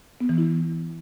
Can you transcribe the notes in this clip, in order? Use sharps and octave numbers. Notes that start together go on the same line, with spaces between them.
B3
E3
E4